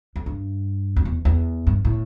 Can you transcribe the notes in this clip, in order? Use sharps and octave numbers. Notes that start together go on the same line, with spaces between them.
F2
G2
F2
E2
E2
G2
A2